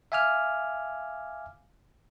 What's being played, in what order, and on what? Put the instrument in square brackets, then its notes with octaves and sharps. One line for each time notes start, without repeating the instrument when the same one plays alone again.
[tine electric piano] E5 F5 G#5 D6 F6